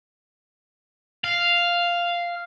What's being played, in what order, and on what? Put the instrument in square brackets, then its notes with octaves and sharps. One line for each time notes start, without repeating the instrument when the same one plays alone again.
[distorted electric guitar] F5